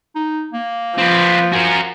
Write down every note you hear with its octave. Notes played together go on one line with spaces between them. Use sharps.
D#4
A#3
F3 C4 B4
F#4 A#4 G#5